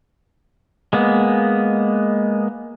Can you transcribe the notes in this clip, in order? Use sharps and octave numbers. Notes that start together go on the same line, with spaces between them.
G#3 A#3 B3